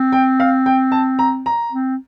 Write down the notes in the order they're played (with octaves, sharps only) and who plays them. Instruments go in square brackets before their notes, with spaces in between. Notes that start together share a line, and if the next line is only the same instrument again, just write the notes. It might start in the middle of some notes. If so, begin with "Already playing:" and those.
Already playing: [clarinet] C4
[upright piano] G5
F5
G5
A5
A#5
A#5
[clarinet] C4